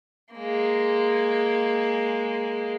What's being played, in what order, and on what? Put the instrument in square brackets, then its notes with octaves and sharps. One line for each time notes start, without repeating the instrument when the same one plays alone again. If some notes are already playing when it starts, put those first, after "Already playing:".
[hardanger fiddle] G#3 A#3